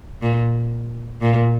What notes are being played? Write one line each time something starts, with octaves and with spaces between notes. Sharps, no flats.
A#2
A#2